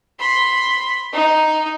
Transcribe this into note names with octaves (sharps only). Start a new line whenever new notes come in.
B5 C6
D#4